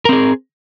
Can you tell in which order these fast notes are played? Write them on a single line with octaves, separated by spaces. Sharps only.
A#4 C4 G#4